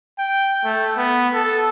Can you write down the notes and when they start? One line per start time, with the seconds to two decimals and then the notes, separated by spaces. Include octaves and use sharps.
0.19 G5
0.64 A3
0.97 B3
1.34 A4